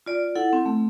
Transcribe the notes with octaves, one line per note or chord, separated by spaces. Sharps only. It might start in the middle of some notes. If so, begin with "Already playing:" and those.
F4 D5
E4 A4 F#5
C4
A3